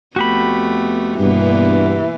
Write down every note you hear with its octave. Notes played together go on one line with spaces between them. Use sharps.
F2 A3 B3 F#4 G4 B5
G2 B2 E3 A#3 B3